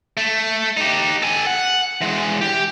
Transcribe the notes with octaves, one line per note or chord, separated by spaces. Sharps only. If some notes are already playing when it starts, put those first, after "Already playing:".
A3
D#4 G4
A4 G#5
F#5
E3 G#3
G4